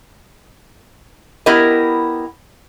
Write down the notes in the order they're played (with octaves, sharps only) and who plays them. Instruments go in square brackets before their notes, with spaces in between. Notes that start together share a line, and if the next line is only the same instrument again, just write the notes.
[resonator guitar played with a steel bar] B3 E4 G4 A#4 D#5